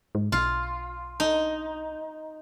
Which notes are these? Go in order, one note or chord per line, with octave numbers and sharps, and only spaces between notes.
G#2
B1 F4
D#4